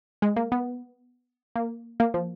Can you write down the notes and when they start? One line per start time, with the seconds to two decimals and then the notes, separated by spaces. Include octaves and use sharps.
0.22 G#3
0.36 A#3
0.52 B3
1.56 A#3
2.00 A#3
2.14 F3